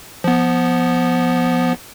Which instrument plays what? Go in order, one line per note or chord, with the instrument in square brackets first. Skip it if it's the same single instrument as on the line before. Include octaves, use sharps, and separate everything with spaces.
[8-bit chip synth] F3 B3